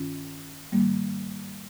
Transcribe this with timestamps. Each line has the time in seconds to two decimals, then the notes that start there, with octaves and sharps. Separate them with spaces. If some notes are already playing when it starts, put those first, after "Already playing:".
Already playing: G2 D#3 C#4 F4
0.72 G#2 D#3 G3 A#3